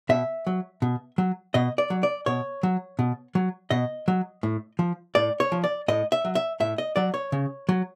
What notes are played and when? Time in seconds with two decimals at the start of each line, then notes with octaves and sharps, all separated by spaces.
0.09 B2 E5
0.47 F#3
0.82 B2
1.18 F#3
1.54 B2 D#5
1.78 D5
1.90 F#3
2.03 D5
2.26 B2 C#5
2.63 F#3
2.99 B2
3.35 F#3
3.70 B2 D#5
4.08 F#3
4.43 A2
4.79 F3
5.15 A2 D5
5.40 C#5
5.52 F3
5.64 D5
5.88 A2 D#5
6.12 E5
6.25 F#3
6.35 E5
6.60 A2 E5
6.78 D#5
6.96 F#3 D5
7.14 C#5
7.32 C#3
7.69 F#3